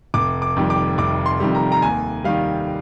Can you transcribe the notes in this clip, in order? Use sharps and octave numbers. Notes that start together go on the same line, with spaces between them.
F1 D6
D6
F2 D#3 G3
D6
F1 D6
C6
F2 D#3 G3
A#5
A#5
D#2 G#5
D#3 G3 F5